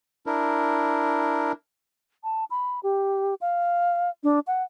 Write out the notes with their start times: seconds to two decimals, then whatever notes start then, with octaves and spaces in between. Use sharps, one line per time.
0.26 D4 E4 A#4
2.24 A5
2.50 B5
2.83 G4
3.41 F5
4.24 D4
4.47 F#5